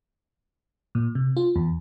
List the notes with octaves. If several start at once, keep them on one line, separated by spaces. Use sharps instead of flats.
A#2
C3
F4
E2